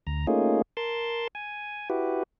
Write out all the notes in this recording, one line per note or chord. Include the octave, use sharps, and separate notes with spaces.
D2 A#5
A3 A#3 C#4 D#4 F4 G#4
A#4 A5 C6
G#5
E4 F#4 G4 B4